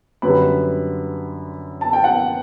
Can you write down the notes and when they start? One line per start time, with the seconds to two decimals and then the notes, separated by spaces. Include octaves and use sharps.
0.22 F#2 D3 G3 B4 B5
1.81 A5
1.93 G5
2.04 F#5